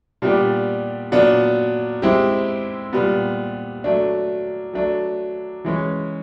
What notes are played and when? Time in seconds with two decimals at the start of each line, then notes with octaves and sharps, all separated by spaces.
0.22 A#2 G3 B3 D4 G4
1.12 A#2 F#3 B3 D4
2.02 G#3 C4 E4 G4
2.93 A#2 G3 B3
3.84 F#3 A3 D4
4.73 F#3 A3 D4
5.65 E3 G#3 C#4